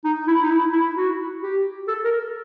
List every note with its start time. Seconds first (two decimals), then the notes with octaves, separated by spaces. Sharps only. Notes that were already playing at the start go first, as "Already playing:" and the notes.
0.04 D#4
0.28 E4
0.42 D#4
0.51 E4
0.73 E4
0.96 F#4
1.43 G4
1.88 A4
2.04 A#4